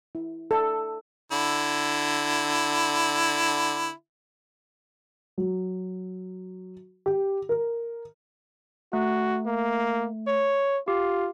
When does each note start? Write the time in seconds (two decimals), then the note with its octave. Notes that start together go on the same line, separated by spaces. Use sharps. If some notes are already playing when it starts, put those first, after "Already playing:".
0.15 E4
0.51 A4
1.32 D3 E4
5.38 F#3
7.06 G4
7.49 A#4
8.93 A3 F#4
9.46 A#3
10.28 C#5
10.88 F4 G4